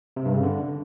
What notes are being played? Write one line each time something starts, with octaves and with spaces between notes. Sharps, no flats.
C3
G2
C#3
D3